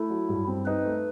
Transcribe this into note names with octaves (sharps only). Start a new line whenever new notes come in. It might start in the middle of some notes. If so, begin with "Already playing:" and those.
Already playing: A3 E4
F#3
G2
C4
D#4 B4
A3